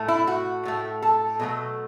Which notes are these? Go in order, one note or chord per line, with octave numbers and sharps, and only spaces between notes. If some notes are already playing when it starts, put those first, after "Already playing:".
Already playing: A2 A3
E4
F#4
A2 A3
A4
B2 F#3 A3